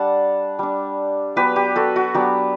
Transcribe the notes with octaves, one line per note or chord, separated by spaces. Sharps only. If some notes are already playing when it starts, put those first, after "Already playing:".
Already playing: G3 D4 F#5 A5
G3 D4
F#3 B3 D4 G4 B4
G4
F#4 A4
F#4
F#3 B3 D4 G4